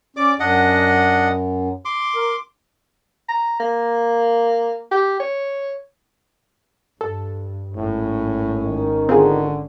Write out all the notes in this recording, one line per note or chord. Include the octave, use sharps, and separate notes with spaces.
C#4 D5 D6
F#2 D4 D#5 F#5
C6 D6
A#4
A#5
A#3
G4
C#5
G2 A4
G#1 A2 C#4
D#3
D3 C4 F4 G#4